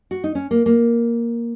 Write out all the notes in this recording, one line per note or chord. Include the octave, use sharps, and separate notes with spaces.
F#4
D#4
C#4
A#3
A#3